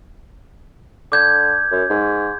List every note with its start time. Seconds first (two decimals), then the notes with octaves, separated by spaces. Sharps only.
1.12 D3 D6 G6 G#6
1.71 F#2
1.90 G#2